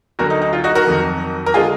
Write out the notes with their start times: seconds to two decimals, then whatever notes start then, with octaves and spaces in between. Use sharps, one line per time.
0.19 D2 D3 F#3 F#4 A#4
0.30 D#4
0.42 D#4
0.53 F4
0.64 D#4 F#4
0.75 F#4 A#4
0.87 F2 D#3 F#3
1.46 A#4
1.54 D3 G#3 F4 G#4